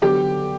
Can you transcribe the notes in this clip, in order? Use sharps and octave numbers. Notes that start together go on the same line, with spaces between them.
D3 F#3 B3 G4 G5